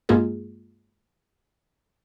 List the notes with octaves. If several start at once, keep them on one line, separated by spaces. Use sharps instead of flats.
G2 G#3 A#3 F4 G#4